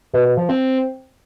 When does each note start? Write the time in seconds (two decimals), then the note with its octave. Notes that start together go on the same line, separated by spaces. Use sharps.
0.13 B2
0.25 B2
0.37 F3
0.49 C4